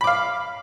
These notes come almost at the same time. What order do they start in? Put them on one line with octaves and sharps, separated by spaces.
B5 D6 F5